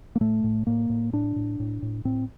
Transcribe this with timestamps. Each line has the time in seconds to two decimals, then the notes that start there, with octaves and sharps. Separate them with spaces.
0.16 A#3
0.21 A2 A3
0.44 A2
0.67 A2 A#3
0.90 A2
1.13 A2 D4
1.36 A2
1.60 A2
1.82 A2
2.05 A2 C4